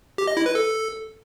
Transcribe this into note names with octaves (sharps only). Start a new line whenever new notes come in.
G4
D#5
E4
B4
A4